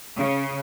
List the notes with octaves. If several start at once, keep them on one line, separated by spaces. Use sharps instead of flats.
C#3